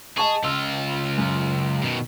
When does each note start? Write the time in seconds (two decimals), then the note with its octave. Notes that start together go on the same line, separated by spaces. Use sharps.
0.18 G#4 D#5 A5 C#6
0.44 C#2 F4 E6
1.18 F#2
1.83 B2 D#3